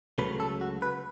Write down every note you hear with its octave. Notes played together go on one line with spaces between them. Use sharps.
C#2 C#3 F#3 A3 B4
A4
F#4
B4